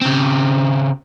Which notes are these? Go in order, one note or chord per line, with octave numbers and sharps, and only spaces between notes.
C#3 C4